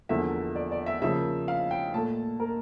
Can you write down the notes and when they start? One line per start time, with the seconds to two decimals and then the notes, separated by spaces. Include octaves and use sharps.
0.09 E2 D3 F3 A#3 E5
0.56 D5
0.72 D5
0.86 E5
1.02 C#3 F3 A#3 E5
1.48 F5
1.71 G5
1.94 A#2 A3 A5
2.40 A#4